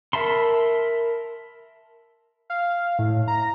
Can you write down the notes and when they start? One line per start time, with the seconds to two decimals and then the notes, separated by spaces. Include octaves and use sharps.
0.13 A#4 E5 A5 B5 C6
2.50 F5
2.99 A2
3.28 A#5